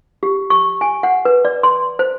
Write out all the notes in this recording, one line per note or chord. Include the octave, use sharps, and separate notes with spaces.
G4
C#6
G#5
F#5
B4
D5
C6
C5